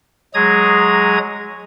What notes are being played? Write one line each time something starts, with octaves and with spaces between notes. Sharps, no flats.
F#3 G#3 G#4 A#5 D#6 G#6